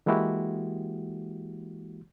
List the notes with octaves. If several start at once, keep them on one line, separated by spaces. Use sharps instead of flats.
E3 G#3 A#3 E4 F#4 G4